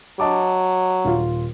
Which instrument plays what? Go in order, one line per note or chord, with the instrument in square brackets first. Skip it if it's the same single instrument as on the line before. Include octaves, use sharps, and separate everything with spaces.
[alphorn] F#3 [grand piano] D#5 A5 D6
[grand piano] D#1 F4